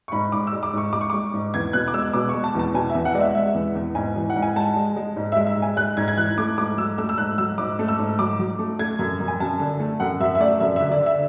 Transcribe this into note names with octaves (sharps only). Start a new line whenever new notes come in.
C#6
G#2 B5
G#2 D6
E6
G#3
D6
G#2 C#6
G#3 D6
C#6
G#3 D6
G#2
E2 G#6
B2 F#6
D6
G#3 E6
B2 D6
C#6
G#3
A5
E2 A5
B2 G#5
E5
E2
F#5
G#3 D5
E5
G#3 E5
E2
E2
G#2 G#5
E3
F#5
G#2
G#5
G#3 A5
G#3
G#3
G#2
E5
G#3
E5
G#2
G#5
G#3 F#6
G#2 G#6
G#6
E3 F#6
A3 D6
G#2 D6
F#3 E6
A3 E6
E6
G#2 F#6
F#3 E6
G#2 D6
A3
E6
G#2
F#3 D6
F#3
A3
A3 G#6
F#2
F#2
G#5
F#2 A5
D3
A3
F#2 F#5
F#2 E5
E5
A3 D5
F#2 E5
E5
D3
D5
D3
E5